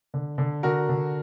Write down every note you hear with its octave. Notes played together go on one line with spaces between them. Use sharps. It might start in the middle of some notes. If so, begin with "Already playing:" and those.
D3
D3
D3 F#4 A#4
D3